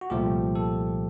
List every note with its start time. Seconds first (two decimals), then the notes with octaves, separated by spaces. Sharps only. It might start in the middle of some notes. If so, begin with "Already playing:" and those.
0.01 F#4
0.10 C2 A#2 F3 A3 G4
0.55 A4